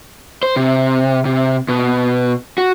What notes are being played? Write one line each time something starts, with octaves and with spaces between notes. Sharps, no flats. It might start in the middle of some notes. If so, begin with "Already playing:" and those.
C5
C3
C3
B2
F#4